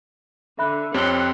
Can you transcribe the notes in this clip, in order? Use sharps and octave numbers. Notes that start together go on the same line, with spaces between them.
D3 E5 B5 F#6
F2 C4 G4 C#5 F#5 C6 F6 G7